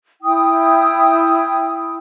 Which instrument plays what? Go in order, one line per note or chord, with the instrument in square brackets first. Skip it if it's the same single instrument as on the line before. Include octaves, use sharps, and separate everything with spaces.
[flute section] E4 G5 D#6